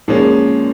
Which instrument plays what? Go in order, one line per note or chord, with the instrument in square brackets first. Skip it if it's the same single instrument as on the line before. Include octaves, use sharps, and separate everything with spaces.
[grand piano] A#2 F3 G#3 C#4